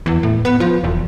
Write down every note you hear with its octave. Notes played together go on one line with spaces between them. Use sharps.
E2
A2
B3
F3
E1